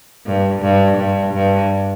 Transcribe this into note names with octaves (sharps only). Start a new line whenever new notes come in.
G2
G2
G2
G2